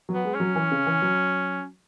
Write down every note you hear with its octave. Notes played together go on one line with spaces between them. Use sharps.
F#3
B3
G#3
F#3 C#4
E3
C#3
E3
F#3